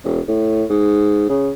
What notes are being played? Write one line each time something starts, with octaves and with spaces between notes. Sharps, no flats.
E1
A2
G#2
C#3